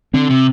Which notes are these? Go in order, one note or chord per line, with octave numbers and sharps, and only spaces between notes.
D3 C4
C3